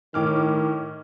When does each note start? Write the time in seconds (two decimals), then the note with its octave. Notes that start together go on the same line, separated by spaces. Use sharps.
0.14 A2 D#3 D6 F6